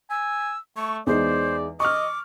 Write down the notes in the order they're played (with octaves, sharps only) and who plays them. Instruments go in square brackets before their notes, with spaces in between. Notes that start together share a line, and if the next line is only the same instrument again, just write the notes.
[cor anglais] G#5 [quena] E6
[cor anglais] A3 [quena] C#6
[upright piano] E2 G#3 D#4 [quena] C5 [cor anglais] D5
[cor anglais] D#5 [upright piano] C#6 F6 [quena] D6